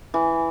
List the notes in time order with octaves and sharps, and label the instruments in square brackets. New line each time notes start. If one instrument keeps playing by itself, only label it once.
[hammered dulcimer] E3